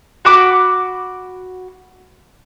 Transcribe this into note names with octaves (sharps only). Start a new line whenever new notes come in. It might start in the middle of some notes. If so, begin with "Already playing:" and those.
F#4 B5 D6